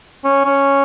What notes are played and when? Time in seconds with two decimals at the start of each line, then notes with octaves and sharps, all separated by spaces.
0.24 C#4
0.45 C#4